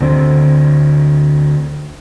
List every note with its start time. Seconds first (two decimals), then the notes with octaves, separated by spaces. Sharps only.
0.01 D2 D3 C4